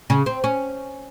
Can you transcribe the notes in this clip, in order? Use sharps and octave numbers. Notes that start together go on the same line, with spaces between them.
C#3
C4
C#4